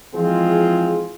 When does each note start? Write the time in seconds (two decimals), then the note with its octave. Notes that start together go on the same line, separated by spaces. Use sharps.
0.15 E3 F3 G#3 C4 F4 G#4